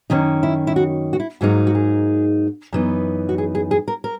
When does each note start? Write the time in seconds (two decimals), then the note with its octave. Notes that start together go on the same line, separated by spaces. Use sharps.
0.10 F#2 D#3 A#3 C#4 D#4
0.43 E4
0.67 E4
0.76 F#4
1.13 F#4
1.20 E4
1.41 G#2 F#3 A#3 D#4 F#4
1.67 F#4
1.75 G#4
2.73 F#2 E3 B3 D#4
3.29 F#4
3.38 G#4
3.55 G#4
3.71 G#4
3.88 A#4
4.04 A#4